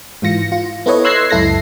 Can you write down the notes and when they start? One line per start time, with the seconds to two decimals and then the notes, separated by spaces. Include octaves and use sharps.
0.22 G#2 E3 F4 A#6 C#7
0.52 F4
0.86 B3 E4 A4 B4 C#5 D#5
1.04 C6 E6 F#6 G#6 A#6 C7
1.30 C#2 F#2 E4 A4 A#6 C7